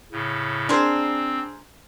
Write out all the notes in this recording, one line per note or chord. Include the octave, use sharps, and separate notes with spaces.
A2 C#3
C4 D4 G#4 A#4 C5